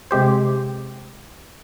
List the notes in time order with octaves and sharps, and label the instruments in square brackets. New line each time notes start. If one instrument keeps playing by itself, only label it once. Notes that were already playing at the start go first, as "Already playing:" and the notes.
[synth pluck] C3 G#3 G4 C5